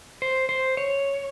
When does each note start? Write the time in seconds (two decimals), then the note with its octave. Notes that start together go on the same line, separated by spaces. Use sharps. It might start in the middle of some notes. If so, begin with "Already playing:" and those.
0.22 C5
0.49 C5
0.77 C#5